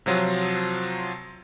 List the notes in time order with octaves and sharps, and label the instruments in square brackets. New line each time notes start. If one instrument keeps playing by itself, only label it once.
[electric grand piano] C3 F3 F#3 F4